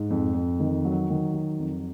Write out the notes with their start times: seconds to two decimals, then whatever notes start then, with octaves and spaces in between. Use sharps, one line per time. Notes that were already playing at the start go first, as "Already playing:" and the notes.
Already playing: G#2
0.10 F2
0.35 F2
0.60 D#3
0.85 F#3
1.10 D#3
1.34 F#3
1.59 F2